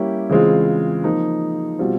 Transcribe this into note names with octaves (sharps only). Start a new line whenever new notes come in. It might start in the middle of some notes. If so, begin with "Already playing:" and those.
Already playing: G3 A#3 C#4 E4 G4
C#3 E3 G#3 C4 F4
F3 A#3 D#4
B2 G3 C4 F4